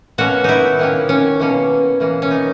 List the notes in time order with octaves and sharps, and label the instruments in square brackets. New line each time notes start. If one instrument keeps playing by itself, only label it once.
[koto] B2 A#3 C#4 F#4
D#4 E4
D#3 A#3 C#4
C#4
B2 A#3 C#4
E3 A#3 C#4
C#4
D#4